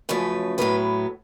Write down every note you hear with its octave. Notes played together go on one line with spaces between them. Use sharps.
F#2 C#3 F3 A3 B4
A2 F#3 B3 B4